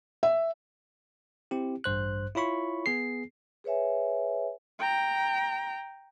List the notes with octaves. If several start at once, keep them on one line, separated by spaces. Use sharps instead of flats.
E5
C4 E4 G4
A1 G2 C5 F#6
E4 F4 C#5 B5 C#6
B3 G#4 C7
G#4 B4 C#5 E5 G#5
G5 A#5